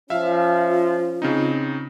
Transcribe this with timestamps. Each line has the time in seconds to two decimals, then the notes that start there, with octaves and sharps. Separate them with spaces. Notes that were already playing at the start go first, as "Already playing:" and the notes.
0.10 F3 C#4 F4 E5 F5
1.22 C#3 C4 D#4